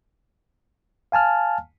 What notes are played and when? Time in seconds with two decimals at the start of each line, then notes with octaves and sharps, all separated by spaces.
1.12 F5 G#5 A5 F6